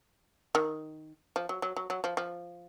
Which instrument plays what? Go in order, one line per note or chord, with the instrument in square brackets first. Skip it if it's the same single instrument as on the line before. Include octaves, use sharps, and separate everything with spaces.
[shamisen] D#3
F3
F#3
F#3
F#3
F#3
F3
F3